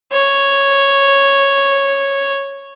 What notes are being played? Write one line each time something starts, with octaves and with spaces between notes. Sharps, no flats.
C#5